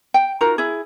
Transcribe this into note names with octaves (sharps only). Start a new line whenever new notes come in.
G5
D#4 F4 F#4 A#4
E4 G#4